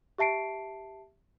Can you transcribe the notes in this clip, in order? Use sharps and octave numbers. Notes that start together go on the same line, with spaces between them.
G4 E5 A5 C7 D7